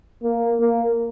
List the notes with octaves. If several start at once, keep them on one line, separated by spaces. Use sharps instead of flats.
A#3
A#3